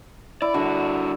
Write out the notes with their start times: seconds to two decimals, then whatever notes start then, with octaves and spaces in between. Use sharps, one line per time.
0.42 E4 D5
0.54 G2 D3 F#4